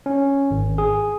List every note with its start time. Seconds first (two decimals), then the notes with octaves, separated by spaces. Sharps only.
0.06 C#4
0.51 G#1
0.78 G#4